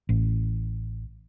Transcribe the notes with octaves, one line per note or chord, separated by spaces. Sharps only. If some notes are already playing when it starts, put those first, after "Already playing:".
A1